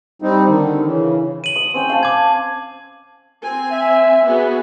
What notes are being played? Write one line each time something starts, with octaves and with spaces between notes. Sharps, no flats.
G3 C4 D#4
D3 D#3
C#3 E3
D#7 F#7
D#6
C4 C#4 G5
F5 A5
D6 G#6
C4 G#5
E5
B3 F#4 G#4